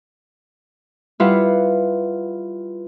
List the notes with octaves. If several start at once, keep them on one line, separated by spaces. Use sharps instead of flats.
G3 E4 F4 B4 F5 F#5